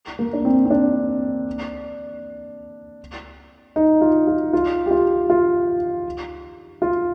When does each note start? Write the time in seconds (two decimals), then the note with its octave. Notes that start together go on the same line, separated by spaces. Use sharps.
0.19 A#3
0.33 D4
0.45 C4
0.65 C4
0.70 D4
3.76 D#4
4.01 F4
4.27 F4
4.53 F4
4.86 G4
4.91 F4
5.30 F4
6.82 F4